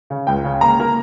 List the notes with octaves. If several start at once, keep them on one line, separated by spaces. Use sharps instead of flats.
C#3
C#2 G5
C#3
A#3 A#5
A#3